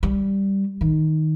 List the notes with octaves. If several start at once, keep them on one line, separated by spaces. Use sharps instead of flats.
G3
D#3